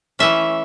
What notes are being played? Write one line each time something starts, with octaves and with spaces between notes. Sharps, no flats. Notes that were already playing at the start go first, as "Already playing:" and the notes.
E3 A3 C#4 E5